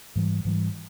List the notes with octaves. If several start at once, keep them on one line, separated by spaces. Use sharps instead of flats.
G#2 E3 G3
G#2 E3 G3